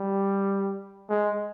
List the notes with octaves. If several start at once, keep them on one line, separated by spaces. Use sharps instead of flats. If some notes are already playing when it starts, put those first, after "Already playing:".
Already playing: G3
G#3